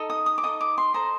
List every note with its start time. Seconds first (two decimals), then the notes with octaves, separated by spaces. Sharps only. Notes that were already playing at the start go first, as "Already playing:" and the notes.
Already playing: D#4 A4 D#5
0.10 D#6
0.26 D#6
0.38 D6
0.43 D#4 A4 D#5 D#6
0.61 D6
0.78 C6
0.94 A4 C5 D#5 A#5